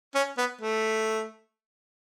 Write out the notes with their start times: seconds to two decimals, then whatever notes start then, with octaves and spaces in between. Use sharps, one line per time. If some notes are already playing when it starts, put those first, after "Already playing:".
0.15 C#4
0.38 B3
0.61 A3